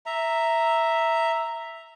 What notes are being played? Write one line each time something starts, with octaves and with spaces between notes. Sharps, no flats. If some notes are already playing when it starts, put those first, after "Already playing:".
E5 A#5